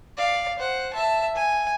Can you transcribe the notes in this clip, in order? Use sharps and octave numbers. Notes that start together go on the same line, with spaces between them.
D5 F5
C5 F#5
E5 A5
G#5